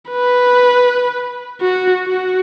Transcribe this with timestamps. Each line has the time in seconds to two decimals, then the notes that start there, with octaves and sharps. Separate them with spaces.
0.10 B4
1.61 F#4
2.07 F#4